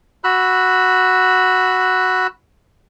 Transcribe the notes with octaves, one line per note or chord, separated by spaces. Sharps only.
F#4 B5 E6 F#6